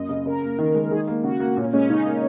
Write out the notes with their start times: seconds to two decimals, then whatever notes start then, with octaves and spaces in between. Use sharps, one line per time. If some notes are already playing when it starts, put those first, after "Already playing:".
Already playing: F#2 A#3 D#5
0.09 C#3
0.26 C#3 A#4
0.42 A#3
0.59 D#3
0.75 G#3
0.91 D#3 G#4
1.07 A#3
1.24 C#3 F#4
1.40 A#3
1.57 A#2 C#4
1.73 G#3 C#4
1.89 C#3 D#4
2.06 A#3